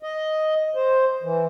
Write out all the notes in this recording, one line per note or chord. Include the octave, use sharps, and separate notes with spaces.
D#5
C5
E3